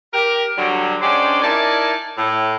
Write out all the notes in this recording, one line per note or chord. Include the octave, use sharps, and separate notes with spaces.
G4 A#4
D3 F#3 G3
G#3 C#4 D4 G4 C5 D5
D#4 E4 A#4 D5 G#5 A5
A2